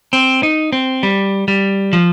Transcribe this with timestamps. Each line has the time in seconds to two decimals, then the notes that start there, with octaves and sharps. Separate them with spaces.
0.13 C4
0.43 D#4
0.73 C4
1.03 G3
1.48 G3
1.93 F3